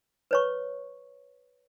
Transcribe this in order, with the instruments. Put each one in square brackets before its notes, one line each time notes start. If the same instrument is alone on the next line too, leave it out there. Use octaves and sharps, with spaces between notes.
[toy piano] B4 C#5 C#6